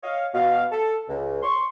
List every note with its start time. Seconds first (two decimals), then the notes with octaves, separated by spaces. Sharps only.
0.03 C#5 D#5 F5
0.34 B2 F5
0.72 A4
1.09 C#2
1.43 C6 C#6